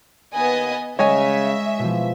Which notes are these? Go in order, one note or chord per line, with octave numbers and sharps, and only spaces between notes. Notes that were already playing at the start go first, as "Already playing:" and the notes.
D#2 B3 D#5 G#5
C#3 G#3 C#5 D#5 E5 G#5
B2 E3 F3